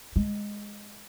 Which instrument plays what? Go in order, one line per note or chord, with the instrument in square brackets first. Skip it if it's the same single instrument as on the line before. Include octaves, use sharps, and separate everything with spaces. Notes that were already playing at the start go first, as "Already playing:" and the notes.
[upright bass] G#3